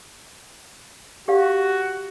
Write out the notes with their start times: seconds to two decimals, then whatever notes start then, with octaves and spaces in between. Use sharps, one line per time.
1.28 F#4 G4 D5 F5